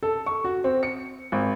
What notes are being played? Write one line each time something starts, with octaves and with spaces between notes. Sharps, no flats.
A4
C#6
F#4
C4
C#7
G#1